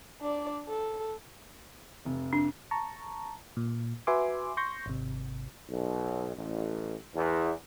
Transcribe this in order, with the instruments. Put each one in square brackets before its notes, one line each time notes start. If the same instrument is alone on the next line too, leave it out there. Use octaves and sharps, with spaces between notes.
[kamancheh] D4 D5
A4
[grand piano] F1
[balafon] D4
[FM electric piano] A5 A#5 C#6
A#2
F#4 B4 E5 G#5 C6 D6
C6 C#6 G6 A#6
G#1 C3
[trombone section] B1
A1
E2